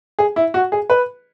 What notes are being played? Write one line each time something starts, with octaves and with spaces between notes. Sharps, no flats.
G#4
E4
F#4
G#4
B4